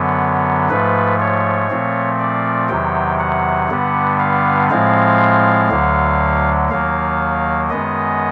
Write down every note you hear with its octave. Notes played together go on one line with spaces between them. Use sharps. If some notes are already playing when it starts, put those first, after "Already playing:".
Already playing: F#2 D3 F#3 B3
G#2 F3 A3 B4
C#5
A#2 F3 A3 C4
D5
E2 C3 D#3 F#3 G5
F#5
G2 D3 G3 B3
F5
A2 F3 G#3 C4 F5
D2 D3 F#3
D#2 D#3 F#3 A#3 F5
F#2 D#3 G#3 B3 D#5